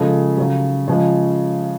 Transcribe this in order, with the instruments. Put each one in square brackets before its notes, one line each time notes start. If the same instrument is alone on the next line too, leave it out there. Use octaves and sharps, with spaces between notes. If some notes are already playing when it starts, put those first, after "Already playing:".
Already playing: [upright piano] C#3 F3 G#3 A4
C#3 F#3
C#3 F3 G#3